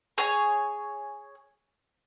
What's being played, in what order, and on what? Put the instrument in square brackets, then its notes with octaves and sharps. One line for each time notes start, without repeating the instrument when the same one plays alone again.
[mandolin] G#4 C#5 G#5